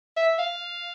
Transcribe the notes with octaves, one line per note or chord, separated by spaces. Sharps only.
E5
F5